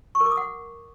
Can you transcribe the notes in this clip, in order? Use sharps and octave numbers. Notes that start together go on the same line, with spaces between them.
C#6
A#4
D6
D#6
F#5